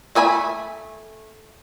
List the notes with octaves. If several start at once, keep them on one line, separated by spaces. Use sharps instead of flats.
A3 E5 G#5 B5